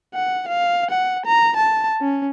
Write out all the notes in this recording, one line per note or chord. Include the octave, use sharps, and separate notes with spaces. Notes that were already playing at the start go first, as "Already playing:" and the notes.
F#5
F5
F#5
A#5
A5
C#4